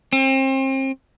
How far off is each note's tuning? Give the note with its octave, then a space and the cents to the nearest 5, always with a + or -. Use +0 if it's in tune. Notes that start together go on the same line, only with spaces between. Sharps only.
C4 +35